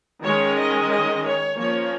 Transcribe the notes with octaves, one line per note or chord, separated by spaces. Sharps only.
D#3 G#3 C#4 C#5
D#5
D#5
C#5
F3 A#3 C#4 C#5